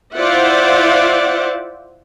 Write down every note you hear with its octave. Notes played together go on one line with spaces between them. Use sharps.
E4 F4 C5 D5 E5 F#5